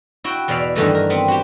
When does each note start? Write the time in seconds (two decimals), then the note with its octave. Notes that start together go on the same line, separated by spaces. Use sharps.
0.24 E4 F#4 G5
0.48 E2 B2 D5 E5 F5 B5
0.75 G2 D#3 E3 G3 A3 F#4
0.95 A#4
1.10 B3 C4
1.28 F#4 G4